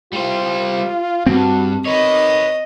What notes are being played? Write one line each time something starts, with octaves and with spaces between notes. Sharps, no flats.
G3 F4 C5
G2 C4 F#4
D#3 B4 C#5 D#5